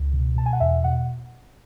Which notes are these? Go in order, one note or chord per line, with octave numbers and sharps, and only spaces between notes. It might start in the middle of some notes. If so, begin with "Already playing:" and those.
Already playing: C#2
B2
B2 A5
G#5
F#5
E2 E5
B2 F#5